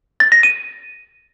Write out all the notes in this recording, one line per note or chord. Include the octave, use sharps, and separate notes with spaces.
A6
A#6
D#7